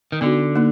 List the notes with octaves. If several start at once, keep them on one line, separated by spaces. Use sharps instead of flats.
D#3
D3 B3 D#4 F#4
A#3 D#4